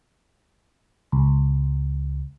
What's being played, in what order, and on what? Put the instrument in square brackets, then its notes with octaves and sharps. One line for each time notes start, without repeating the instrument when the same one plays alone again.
[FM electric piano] C#2